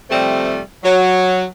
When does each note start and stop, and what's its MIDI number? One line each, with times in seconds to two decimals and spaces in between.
0.10 0.59 48
0.10 0.59 53
0.10 0.59 55
0.10 0.59 57
0.10 0.59 60
0.83 1.43 54